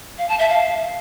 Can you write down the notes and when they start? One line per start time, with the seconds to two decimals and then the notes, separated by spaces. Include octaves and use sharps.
0.18 F5
0.29 A5
0.39 E5
0.49 F5